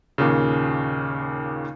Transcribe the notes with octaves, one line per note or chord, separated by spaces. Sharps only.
D#2 A#2 C#3